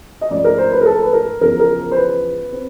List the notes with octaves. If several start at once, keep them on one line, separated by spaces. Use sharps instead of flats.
D#5
G#2 F3 A3 C#4 D5
A#4
C5
B4
A#4
A4
B4
A#4
E2 C#3 F3 A#4
A#4
C5
B4
C4